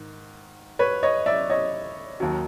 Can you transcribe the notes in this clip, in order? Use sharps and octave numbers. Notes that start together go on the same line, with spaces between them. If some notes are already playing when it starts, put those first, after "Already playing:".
Already playing: G#2 D#3
B4 C#5
C#5 D#5
D5 E5
C#5 D#5
D#2 D#3 F#3